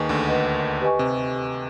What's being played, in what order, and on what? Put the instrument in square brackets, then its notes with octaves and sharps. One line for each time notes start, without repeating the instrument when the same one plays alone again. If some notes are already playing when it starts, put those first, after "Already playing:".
Already playing: [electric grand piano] D#2 D#3 [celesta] G#4 B4 D#5 G#5 C#6
[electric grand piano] D2 D3
[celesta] B4 D#5 F#5
G4 B4 D#5 G#5 C#6
[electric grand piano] C3